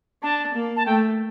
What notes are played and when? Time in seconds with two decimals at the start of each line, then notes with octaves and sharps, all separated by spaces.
0.23 D4 A5
0.54 A#3
0.76 A5
0.86 A3 G5